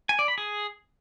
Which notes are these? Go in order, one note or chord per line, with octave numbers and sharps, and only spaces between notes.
G#5
D5
B5
G#4